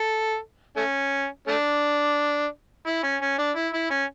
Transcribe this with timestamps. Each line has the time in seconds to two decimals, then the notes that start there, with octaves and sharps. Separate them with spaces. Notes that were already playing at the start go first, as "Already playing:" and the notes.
Already playing: A4
0.77 A3 C#4
1.48 A3 D4
2.86 E4
3.04 C#4
3.22 C#4
3.39 D4
3.56 E4
3.74 E4
3.91 C#4